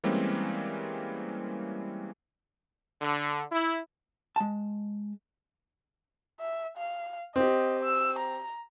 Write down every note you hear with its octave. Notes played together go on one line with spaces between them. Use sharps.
E3 G3 G#3 A#3 C4 C#4
D3
E4
G#3 A5
E5
F5
C4 G4 D#5
E6
A#5